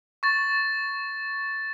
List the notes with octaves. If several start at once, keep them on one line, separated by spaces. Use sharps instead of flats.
C#6 A6